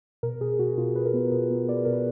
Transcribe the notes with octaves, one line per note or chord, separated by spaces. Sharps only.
B2 A#4
B2 G#4
B2 F#4
B2 F4
B2 B4
A#4
B3 B4
B2 A#4
B3
B3 D5
B4
B2 A#4
B4